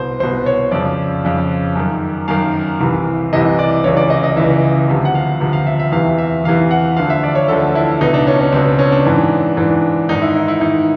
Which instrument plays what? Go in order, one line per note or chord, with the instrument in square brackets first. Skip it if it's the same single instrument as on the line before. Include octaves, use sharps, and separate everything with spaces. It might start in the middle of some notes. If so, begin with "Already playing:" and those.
Already playing: [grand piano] C2 B2 C5
C2 B2 C5
C#5
F2 C#3 F3 D5
F2 C#3 F3
F#2 D#3
F#2 D#3 F5
C2 C3 E3
C2 C3 E3 D#5
D5
C#2 C#3 E3 C#5
D5
D#5
D#5
C#2 C#3 E3 E5
D2 C3 F3
F#5
F5
D2 C3 F3
F5
E5
E5
E2 C3 E3 F5
E5
E2 C3 E3 F5
F#5
D2 D3 F3 F5
E5
D5
C#5
D2 D3 F3 A4
E4
C#2 B2 D#4
D4
C#4
C#4
C#2 B2 C4
D4
C#4
D4
G#2 E3
G#2 E3 D4
G#2 D#3 D#4
E4
E4
E4
G#2 D#3 D#4